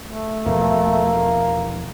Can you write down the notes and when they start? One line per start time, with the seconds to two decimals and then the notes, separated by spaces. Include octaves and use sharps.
0.04 A3
0.46 E2 B2 F3 A#3